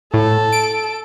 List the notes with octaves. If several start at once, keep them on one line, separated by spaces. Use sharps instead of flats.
A2 A4
D7